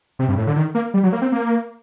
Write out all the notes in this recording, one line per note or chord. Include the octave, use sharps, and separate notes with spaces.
C3
G2
A2
D3
D#3
A#3
G3
F#3
A#3
C4
A#3